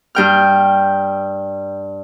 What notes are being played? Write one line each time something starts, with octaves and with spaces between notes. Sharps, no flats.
G2 G5 F6